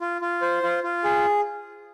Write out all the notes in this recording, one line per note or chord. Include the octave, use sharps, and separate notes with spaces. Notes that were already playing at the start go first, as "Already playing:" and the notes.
F4
F4
C5
F4
F4
G#4